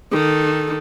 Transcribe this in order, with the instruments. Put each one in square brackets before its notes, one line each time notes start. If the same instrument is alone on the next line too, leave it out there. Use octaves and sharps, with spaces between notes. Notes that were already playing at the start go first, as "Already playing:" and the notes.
[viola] D#3 A4